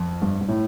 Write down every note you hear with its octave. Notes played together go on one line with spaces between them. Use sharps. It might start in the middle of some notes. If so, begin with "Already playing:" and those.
Already playing: F2
G2
G2
A2